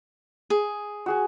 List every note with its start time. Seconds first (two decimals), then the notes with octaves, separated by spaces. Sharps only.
0.50 G#4
1.06 F#4 G#4 G#5